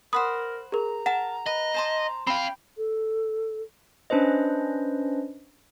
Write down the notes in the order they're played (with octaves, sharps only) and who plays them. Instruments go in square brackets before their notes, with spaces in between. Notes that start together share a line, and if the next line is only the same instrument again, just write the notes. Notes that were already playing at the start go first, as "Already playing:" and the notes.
[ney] A#4 [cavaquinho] C5 F#5 B5 [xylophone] D#6
[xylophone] G#4 A#4 [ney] A#5
[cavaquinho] A#4 A5 [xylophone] F#5 E7
[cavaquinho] B4 [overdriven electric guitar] D#5
[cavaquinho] C5 A5 C6
[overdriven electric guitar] C4 F5 [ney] G5 [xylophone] B5
[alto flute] A4
[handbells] C#4 D4 B4 C5 D#5